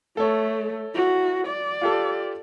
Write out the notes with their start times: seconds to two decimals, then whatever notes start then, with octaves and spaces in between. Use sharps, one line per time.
0.17 A3 A4 C#5
0.95 E4 F#4
1.47 D5
1.82 F4 G4 A4